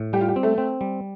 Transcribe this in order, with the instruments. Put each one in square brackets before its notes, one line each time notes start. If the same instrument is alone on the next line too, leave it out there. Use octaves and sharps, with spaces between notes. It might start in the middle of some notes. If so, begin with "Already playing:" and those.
Already playing: [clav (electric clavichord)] A2
[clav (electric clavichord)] G3 [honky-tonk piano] G4
[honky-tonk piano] F4
G4
[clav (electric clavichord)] C4
[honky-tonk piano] A3
[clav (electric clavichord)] C4
G3